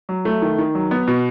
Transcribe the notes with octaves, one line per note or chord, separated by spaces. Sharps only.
F#3
A3
D#3
D#3
F#3
B3
B2